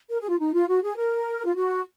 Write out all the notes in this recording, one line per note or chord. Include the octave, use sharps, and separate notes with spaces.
A#4
G#4
F4
D#4
F4
F#4
G#4
A#4
F4
F#4